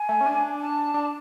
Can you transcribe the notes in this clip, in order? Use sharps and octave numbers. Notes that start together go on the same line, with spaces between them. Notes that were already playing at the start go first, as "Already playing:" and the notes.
Already playing: G#5
A3
C#4
D4
A5
D4